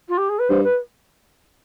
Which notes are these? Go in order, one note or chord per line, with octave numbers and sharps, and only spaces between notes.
F4
G4
G#4
B4
G2 C5
B4